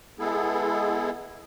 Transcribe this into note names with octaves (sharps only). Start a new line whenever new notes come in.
G#3 B3 E4 G#4 A4